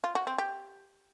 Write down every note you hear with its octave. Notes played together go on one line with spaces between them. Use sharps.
F4
F#4
C4
G4